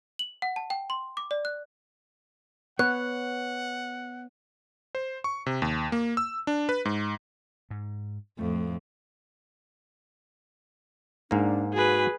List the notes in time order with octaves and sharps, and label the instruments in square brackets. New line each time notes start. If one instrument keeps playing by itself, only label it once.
[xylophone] F#7
F#5
A5
G5
C6
D6
D5
F#6
[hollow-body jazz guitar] B3 B4 C#5 [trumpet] F#5 [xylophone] F#6
[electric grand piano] C5
C#6
C3
D#2
A#3
E6
D4
B4
G#2
[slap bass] G#2
[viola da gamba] F2 A2 [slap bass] A3
[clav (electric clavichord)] G#2 A#3 [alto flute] D4
[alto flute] F#4 [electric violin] G#4 B4